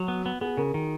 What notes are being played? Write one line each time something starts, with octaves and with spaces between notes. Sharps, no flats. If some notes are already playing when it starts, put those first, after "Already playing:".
Already playing: F#3 F#4
B3
B3
B3 G#4
C#3 A#4
D#3